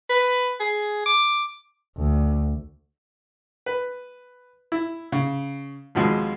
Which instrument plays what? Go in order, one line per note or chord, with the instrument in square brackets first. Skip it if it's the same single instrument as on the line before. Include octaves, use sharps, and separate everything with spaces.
[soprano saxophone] B4
G#4
D6
[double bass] D2
[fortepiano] B4
E4
C#3
D#2 B2 F3 G#3 C4